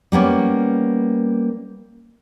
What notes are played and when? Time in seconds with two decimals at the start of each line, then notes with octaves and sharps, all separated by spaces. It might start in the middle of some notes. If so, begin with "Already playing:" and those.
0.12 G3 A#3 B3 C#4